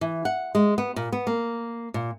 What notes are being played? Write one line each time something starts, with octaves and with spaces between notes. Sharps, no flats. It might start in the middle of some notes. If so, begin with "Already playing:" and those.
E3
F#5
G#3
B3
A#2
B3
A#3
A#2